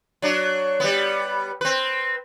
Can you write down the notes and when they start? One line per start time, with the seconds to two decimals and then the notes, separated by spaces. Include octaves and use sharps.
0.22 F#3 D4
0.80 G3 B3
1.61 C4 B4